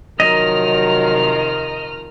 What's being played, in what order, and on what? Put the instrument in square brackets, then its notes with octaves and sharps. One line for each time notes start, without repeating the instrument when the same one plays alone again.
[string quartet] C3 D#3 F3 [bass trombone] F#3 [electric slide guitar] D#5 [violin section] A#5 F6